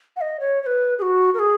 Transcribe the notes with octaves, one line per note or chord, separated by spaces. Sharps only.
F#5
D#5
C#5
C#5
B4
G#4
F#4
A#4
G#4